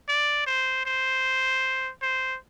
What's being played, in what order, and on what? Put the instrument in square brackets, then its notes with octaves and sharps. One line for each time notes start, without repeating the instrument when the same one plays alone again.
[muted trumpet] D5
C5
C5
C5